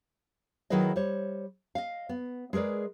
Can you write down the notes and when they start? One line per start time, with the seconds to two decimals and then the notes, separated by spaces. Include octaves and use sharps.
0.70 D#3 F#3 E4 G#4 B4 D#5
0.96 G3 C5 C#5
1.75 D#5 F5
2.09 B3
2.53 G#3 G#4 A#4 B4 D5